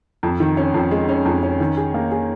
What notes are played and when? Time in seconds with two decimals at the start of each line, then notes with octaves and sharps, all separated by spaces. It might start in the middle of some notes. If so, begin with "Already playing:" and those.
0.23 F2
0.40 D#3
0.57 C#4
0.74 F2
0.91 G#3
1.09 C#4
1.26 F2
1.43 C#4
1.60 D#3
1.77 G#4
1.94 A#3
2.12 G#4